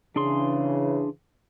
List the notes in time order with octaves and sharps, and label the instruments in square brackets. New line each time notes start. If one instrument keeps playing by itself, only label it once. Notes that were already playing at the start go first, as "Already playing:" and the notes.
[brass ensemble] C#3 E3 [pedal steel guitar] D4 G#4 C6